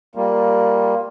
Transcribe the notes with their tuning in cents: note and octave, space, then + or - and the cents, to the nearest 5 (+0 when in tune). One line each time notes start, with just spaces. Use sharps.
G3 +0 A#3 +0 F4 +10